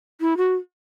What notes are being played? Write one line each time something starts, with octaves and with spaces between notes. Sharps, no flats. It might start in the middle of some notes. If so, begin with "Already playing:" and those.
E4
F#4